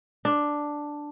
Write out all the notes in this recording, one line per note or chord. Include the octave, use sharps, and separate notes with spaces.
D4